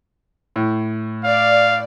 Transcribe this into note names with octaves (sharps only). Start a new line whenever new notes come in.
A2
D5 F5